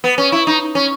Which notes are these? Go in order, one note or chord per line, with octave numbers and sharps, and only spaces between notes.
B3
C#4
E4
D#4
C#4